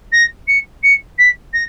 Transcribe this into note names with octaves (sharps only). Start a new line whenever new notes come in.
A#6
C#7
C#7
B6
A#6